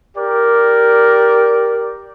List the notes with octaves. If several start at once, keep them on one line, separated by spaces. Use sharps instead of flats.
G4 A#4 D5